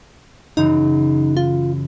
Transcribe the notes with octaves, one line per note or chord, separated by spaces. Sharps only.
F#2 C#3 E3 D#4
F4